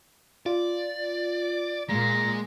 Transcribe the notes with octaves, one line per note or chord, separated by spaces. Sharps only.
F4 D5
A#2 G#3 A#5